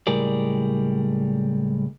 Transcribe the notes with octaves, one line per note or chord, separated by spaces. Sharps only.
C#2 A2 G3 G#4 A#4 D5